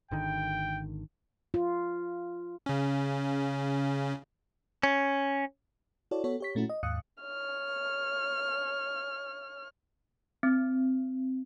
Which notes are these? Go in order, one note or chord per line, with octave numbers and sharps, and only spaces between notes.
G#1 D3 D#3 G5
F4
C#3 C#4
C#4
E4 F#4 A4 C#5 D5
B3 F#4 A4 C#5
G4 C#5 B6
A#2 A3 C#4 E4 F#4
D#5
D#2 G#2 F5 D#6 F#6 C#7
C#5 F6
C4